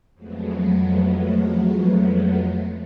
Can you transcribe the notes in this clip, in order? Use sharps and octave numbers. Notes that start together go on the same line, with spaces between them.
F2 F3 F#3 G#3 A3 B3